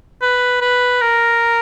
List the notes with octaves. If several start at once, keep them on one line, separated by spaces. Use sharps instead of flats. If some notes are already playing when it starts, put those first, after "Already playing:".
B4
B4
A#4